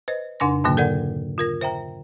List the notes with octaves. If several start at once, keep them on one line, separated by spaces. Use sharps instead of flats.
B4 C5 D#5
F2 C#3 D4 G#5 C6 A#6
G#2 B2 D3 F#3 A#3
A4 A#4 D5 F#5
F4 A#4 A#6
C5 E5 G5 A#5